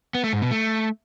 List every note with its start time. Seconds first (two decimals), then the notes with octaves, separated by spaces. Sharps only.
0.15 B3
0.24 A3
0.33 G#2
0.42 B2
0.51 A3